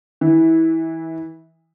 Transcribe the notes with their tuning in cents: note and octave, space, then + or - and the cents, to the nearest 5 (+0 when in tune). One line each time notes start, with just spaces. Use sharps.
E3 -25